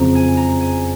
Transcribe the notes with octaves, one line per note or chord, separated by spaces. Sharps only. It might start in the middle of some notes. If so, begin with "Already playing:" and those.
Already playing: F#1 F2 C#3 G#3 C4 A#5
G#5
A#5
G#5